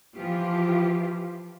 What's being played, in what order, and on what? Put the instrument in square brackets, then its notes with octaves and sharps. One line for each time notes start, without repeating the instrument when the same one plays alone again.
[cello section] E3 F3 F4 G4